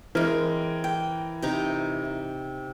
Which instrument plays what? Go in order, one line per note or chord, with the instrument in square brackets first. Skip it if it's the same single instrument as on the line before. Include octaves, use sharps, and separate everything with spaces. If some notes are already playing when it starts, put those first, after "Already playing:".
[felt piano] E3 A#4 [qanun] G#3 C4
[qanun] G5
C3 D#4 A#5